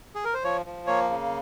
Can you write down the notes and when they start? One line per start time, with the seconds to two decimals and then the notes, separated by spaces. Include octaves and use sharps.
0.15 G#4
0.25 A#4
0.34 C5
0.44 F3 C#5
0.66 F3
0.87 A#3 C#5
1.10 C#3